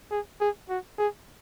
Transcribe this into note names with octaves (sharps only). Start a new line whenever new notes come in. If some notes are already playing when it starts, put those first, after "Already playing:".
G#4
G#4
F#4
G#4